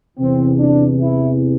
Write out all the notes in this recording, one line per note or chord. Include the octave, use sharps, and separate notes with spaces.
E2 C3 E3 C4
D4
E4